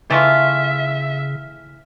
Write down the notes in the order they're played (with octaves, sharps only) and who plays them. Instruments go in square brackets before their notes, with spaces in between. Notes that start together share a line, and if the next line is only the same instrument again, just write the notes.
[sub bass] C#3 [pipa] E3 A3 F4 [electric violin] E5